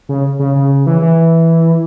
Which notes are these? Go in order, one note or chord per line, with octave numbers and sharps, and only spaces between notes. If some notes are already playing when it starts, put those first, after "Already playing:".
C#3
C#3
C#3
E3
E3